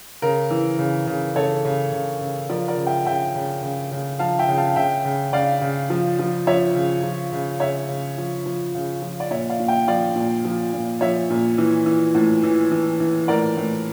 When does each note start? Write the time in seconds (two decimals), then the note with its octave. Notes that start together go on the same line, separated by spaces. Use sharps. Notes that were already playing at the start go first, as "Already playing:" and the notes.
0.22 C#3 A#4
0.51 E3
0.78 C#3
1.07 C#3
1.36 C#3 A4 C#5
1.65 C#3
1.93 C#3
2.21 C#3
2.49 F3 A#4 D5
2.68 A#4 D5
2.77 C#3
2.87 E5 G5
3.06 C#3 E5 G5
3.35 C#3
3.63 C#3
3.91 C#3
4.19 F3 F5 A5
4.39 E5 G5
4.48 C#3
4.57 F5 A5
4.76 C#3 E5 G5
5.05 C#3
5.33 C#3 D5 F5
5.61 C#3
5.90 F3
6.19 F3
6.47 F3 C#5 E5
6.75 C#3
7.03 F3
7.32 C#3
7.60 C#3 C#5 E5
7.89 C#3
8.18 F3
8.46 F3
8.74 C#3
9.02 F3
9.20 D5
9.31 A#2 C#5 E5
9.50 D5 F5
9.60 A#2
9.68 E5 G5
9.88 F3 D5 F5
10.16 A#2
10.45 F3
10.73 A#2
11.01 F3 C#5 E5
11.30 A#2
11.58 E3
11.86 E3
12.15 A2
12.44 E3
12.72 E3
13.00 E3
13.28 A2 A#4 D5
13.57 A2